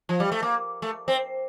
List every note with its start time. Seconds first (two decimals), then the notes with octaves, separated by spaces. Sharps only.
0.09 F3
0.20 G3
0.32 A3
0.43 A#3
0.82 A3
1.08 C4